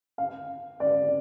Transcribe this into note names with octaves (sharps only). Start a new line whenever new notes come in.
F5
D5